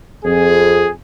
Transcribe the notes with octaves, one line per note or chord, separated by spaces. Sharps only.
F2 G#4